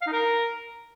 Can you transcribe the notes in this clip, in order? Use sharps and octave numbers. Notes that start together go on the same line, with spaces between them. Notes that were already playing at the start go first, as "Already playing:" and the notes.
F5
D#4
A#4